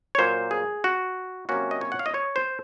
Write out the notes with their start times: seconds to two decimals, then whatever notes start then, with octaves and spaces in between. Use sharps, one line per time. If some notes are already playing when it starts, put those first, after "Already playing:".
0.15 C#5
0.18 A#2 F#3 A#3 C5
0.51 G#4
0.84 F#4
1.49 C3 F#3 A#3 C#4 F#4
1.71 D#5
1.81 C#5
1.92 F#5
1.99 F5
2.06 D#5
2.14 C#5
2.36 C5